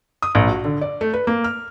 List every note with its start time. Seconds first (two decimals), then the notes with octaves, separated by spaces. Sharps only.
0.22 D#6
0.35 A#1
0.48 F#4
0.65 D3
0.81 D5
1.01 A3
1.13 B4
1.27 A#3
1.44 F6